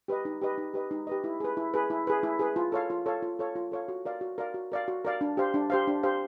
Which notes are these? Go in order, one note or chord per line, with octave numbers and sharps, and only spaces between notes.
G4 B4 D#5
D#4
G4 B4 D#5
D#4
G4 B4 D#5
D#4
G4 B4 D#5
E4
G#4 B4
E4
G#4 B4
E4
G#4 B4
E4
G#4 B4
F4
A4 C#5 F5
F4
A4 C#5 F5
F4
A4 C#5 F5
F4
A4 C#5 F5
F#4
A#4 D5 F5
F#4
A#4 D5 F5
F#4
A#4 D5 F5
F#4
A#4 D5 F5
D4
G4 C5 F5
D4
G4 C5 F5
D4
G4 C5 F5